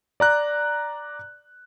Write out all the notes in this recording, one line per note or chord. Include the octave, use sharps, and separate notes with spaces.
D5 A#5 F#6